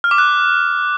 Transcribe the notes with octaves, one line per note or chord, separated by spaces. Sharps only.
F6
D6
F#6